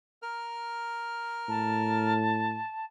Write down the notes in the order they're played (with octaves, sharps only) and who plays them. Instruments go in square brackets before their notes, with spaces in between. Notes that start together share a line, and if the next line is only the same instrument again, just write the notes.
[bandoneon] A#4 F6
[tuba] A2 [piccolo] A5